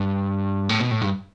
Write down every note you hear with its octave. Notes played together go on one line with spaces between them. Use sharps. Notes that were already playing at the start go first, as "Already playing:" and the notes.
Already playing: G2
A2
B2
A2
G2